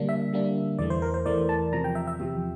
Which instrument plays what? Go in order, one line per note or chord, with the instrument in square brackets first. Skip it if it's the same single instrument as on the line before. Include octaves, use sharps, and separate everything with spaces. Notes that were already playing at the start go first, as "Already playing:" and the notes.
Already playing: [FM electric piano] D3 G3 A#3 D4
E5
D3 G3 A#3 D4
E2 E3 A3 D5
C5
A#4
C5
E2 E3 A3 D5
A5
E2 C3 F3 A#5
G5
E5
E5
E2 C3 F3